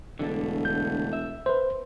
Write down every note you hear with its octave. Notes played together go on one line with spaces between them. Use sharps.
E1 D3 A3
G6
E5
B4 C5